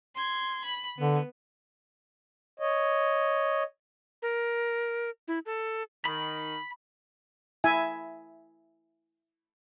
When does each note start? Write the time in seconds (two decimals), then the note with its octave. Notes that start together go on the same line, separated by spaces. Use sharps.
0.16 C6 G#6
0.65 B5
0.98 D3 B3
2.60 C#5 D#5
4.22 A#4
5.28 E4
5.46 A4
6.05 D#3 B5
7.64 E4 E5 G#5